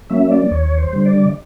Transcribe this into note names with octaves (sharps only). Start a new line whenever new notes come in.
F#3 A#3 C#4 E5
D5
D#2 C#5
C5
D3 G3
D5